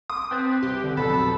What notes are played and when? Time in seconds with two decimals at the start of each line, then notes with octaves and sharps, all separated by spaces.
0.10 C6 D6 D#6
0.31 C4 B4 F#6 G6 A6
0.62 C2 G4
0.84 D3
0.97 B1 F2 B2 A4 B5